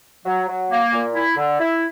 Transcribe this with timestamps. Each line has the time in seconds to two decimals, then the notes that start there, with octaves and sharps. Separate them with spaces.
0.25 F#3
0.48 F#3
0.70 A#3
0.92 A#2
1.14 E4
1.37 D3
1.60 E4